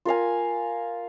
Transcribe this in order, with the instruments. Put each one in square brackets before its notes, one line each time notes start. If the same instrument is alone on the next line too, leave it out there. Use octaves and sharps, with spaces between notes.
[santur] F4 A#4 F5 G#5